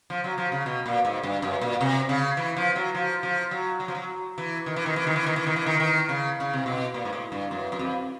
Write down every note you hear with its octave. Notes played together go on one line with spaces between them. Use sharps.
F3
F#3
F3
C#3
B2
A#2
G#2
G2
F#2
A#2
C3
C#3
E3
F3
F#3
F3
F3
F#3
F#3
F3
F#3
E3
D#3
E3
D#3
E3
D#3
E3
D#3
E3
D#3
E3
D#3
D#3
C#3
C#3
C3
B2
A#2
G#2
A2
G2
F#2
F#2
F2